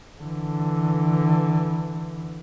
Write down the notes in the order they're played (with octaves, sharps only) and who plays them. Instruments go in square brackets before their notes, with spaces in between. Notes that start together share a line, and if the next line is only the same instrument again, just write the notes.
[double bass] D3 E3